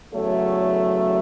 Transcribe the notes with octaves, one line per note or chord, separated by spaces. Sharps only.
E2 C#3 F#3 A3 A4 C#5